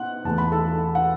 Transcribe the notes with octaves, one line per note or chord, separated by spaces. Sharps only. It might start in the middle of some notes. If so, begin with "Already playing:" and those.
Already playing: B2 F#5 F#6
E2 E3 A3 A5
B5
A4 A5
F#5